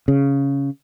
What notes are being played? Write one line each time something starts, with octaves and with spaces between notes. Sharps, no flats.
C#3